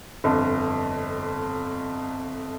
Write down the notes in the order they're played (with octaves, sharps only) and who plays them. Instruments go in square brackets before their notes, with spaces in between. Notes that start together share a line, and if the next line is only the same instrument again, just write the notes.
[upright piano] G1 F2